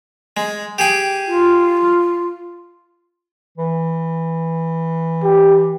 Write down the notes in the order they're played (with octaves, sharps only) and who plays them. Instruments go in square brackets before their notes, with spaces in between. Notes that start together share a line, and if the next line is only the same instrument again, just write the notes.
[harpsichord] G#3
G4 G#4 G5
[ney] F4
[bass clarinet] E3
[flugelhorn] G4